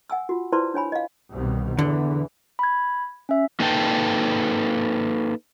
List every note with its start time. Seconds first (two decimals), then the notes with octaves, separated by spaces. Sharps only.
0.10 F#5 G#5 E6
0.29 F4 F#4
0.52 E4 B4 C5 D5 A5 C6
0.74 D4 C#5 G#5 B5
0.92 D#5 F5
1.32 C2 B2 D#3
1.79 E2 D3 E3
2.59 B5 G#6
3.29 C#4 E5
3.60 A#3 D#4 A4 B4 G5 A5